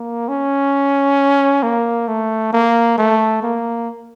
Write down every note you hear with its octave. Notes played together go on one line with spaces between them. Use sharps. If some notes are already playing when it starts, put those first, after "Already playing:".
Already playing: A#3
C#4
A#3
A3
A#3
A3
A#3